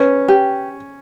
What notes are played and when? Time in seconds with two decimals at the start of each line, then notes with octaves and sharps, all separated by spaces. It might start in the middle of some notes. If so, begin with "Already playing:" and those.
Already playing: C#4 B4
0.28 G4